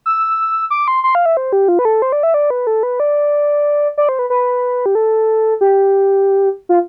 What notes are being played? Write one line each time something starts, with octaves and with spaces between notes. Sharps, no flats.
E6
D6
C6
C6
F5
E5
C5
G4
F4
B4
A4
C5
D5
E5
D5
B4
A4
B4
D5
D5
C5
B4
B4
G4
A4
G4
F4